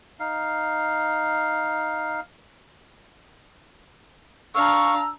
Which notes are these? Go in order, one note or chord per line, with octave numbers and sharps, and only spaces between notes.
D#4 F5
D4 F5 A#5 C#6 E6